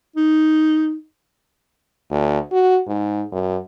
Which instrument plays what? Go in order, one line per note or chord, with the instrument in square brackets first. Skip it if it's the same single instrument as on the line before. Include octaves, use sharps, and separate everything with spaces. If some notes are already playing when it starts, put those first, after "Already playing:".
[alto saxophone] D#4
[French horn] D2
F#4
G#2
F#2